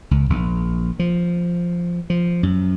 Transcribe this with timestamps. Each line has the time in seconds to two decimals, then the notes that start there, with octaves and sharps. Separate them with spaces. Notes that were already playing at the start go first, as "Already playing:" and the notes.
0.11 C#2
0.30 A#1
0.99 F3
2.10 F3
2.43 F#2